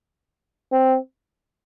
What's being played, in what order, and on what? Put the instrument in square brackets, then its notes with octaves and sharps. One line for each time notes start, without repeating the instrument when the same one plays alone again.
[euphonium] C4